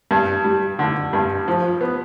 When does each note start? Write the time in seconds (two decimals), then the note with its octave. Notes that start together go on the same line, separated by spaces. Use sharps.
0.11 G2
0.44 G3
0.79 D3
1.13 G2
1.48 F3
1.81 B3